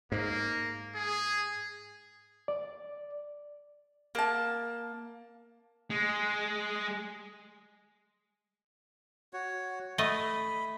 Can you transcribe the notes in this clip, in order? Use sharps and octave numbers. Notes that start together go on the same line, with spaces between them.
G#2 A#3
G#4
D5
A#3 A5
G#3
F#4 C#5
A3 D#5 B5